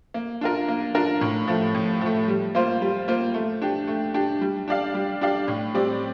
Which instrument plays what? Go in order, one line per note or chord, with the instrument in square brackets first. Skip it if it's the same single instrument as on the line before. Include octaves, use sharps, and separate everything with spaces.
[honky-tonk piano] A#3
D4 F4 A#4
A#3
D4 F4 A#4
A2
F3 A3
A2
F3 A3
G3
A#3 F4 C5
G3
A#3 F4 C5
A3
D4 G4
A3
D4 G4
G3
D4 G4 D5 F5
G3
D4 G4 D5 F5
A2
G3 C4 G4 D5